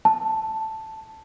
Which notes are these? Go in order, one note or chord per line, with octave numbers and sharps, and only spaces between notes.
A5